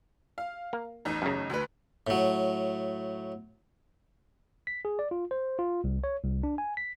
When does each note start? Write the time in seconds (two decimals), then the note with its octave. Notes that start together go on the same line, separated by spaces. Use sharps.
0.38 F5
0.73 A#3
1.05 A1 E2 D#4
1.22 F#2 C#3
1.50 D2 B4
2.07 A2 F#3
4.67 B6
4.85 G#4
4.99 D5
5.11 F4
5.31 C5
5.59 F4
5.84 C2
6.04 C#5
6.23 C2
6.43 D4
6.58 G#5
6.77 B6